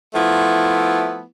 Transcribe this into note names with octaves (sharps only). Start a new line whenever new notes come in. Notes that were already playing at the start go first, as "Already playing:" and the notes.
F3 A3 B3 E4